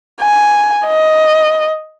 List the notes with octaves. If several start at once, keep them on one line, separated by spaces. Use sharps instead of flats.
G#5
D#5